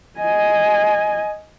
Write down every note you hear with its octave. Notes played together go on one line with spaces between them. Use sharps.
D#5 G#5